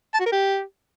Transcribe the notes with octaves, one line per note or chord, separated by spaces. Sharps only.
A5
F#4
A#4
G4